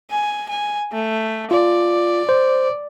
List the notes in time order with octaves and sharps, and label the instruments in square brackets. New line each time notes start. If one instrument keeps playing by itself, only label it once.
[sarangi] G#5
G#5
A3
[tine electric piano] F4 [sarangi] D5
[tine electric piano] C5